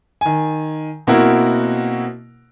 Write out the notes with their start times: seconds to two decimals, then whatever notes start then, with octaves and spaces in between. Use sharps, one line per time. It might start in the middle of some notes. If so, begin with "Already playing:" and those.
0.21 D#3 G#5
1.07 B2 A#3 C4 E4 F#4 A#4